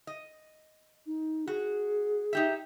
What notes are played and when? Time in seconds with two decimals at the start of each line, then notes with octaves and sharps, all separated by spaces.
0.07 D#5
1.06 D#4
1.48 F#4 G#4
2.33 D#4 G4 E5